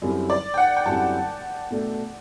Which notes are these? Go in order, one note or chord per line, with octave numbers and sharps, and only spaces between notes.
F#2 D3 G3 C4 E4
D5
G5
F#5
G5
F#2 D3 G3 C4 E4 A5
B2 A3 D4 A4